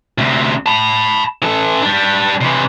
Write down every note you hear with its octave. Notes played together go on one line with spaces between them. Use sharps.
D2 C3
A5 B5
E3 A4
G3 D4
C3 E3